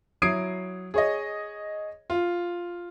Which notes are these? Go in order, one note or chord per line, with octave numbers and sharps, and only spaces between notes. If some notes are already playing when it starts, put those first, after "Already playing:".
F#3 E4 D#6 G#6 C7 D7
G#4 C#5 D#5
F4